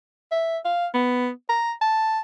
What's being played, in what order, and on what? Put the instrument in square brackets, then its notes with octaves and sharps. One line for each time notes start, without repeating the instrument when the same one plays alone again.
[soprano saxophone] E5
F5
B3
A#5
A5